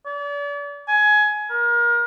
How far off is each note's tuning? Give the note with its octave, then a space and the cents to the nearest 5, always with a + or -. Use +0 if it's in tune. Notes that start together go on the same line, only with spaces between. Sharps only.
D5 -40
G#5 +20
A#4 +30